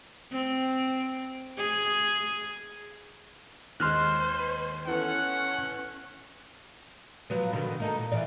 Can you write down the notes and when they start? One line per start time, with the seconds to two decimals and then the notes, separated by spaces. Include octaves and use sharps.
0.32 C4
1.57 G#4
3.80 D#2 G#3 C5 C6 F6 F#6
4.87 E3 B3 C#4 A4 F#5
7.30 F3 F#3 B3
7.53 B2 D3 D#3
7.80 A#3 D#4 A4
7.96 A#2
8.12 E3 F4 D5